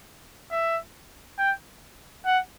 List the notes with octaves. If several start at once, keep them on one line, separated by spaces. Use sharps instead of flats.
E5
G5
F#5